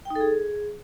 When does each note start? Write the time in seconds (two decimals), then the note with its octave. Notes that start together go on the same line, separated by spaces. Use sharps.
0.05 G5
0.10 D#4
0.15 A4
0.20 G#4